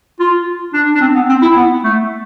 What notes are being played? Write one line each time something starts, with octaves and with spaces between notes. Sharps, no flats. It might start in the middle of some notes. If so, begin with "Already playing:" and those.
F4
D4
D4
C4
B3
C4
E4
B3
A3